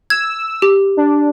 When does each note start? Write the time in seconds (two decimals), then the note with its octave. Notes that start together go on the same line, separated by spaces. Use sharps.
0.10 E6 G#6
0.62 G4
0.97 D4